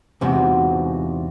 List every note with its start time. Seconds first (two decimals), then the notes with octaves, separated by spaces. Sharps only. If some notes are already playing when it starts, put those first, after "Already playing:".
0.21 E2 G#2 C3 F4 F#4